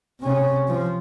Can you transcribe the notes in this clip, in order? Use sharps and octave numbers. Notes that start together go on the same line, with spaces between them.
C3 C#4
F3